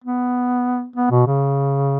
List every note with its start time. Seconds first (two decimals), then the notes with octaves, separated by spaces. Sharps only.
0.04 B3
0.96 B3
1.11 B2
1.27 C#3